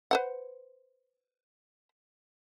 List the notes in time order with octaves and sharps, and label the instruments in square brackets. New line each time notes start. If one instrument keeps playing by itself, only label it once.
[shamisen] B4 C5 F#5